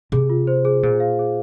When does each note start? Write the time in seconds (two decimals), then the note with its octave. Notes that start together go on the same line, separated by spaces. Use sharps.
0.12 C3 G#4
0.30 F4
0.47 C5
0.65 G#4
0.83 A#2 G#4
1.00 F5
1.19 G#4